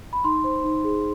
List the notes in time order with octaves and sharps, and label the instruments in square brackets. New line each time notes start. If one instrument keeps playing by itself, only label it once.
[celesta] B5
D#4 C6
C5
D#4
G#4